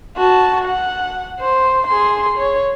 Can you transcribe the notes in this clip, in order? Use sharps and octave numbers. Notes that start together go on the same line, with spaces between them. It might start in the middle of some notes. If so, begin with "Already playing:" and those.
F#4 A5
F#5
C5
G#4 C6
C#5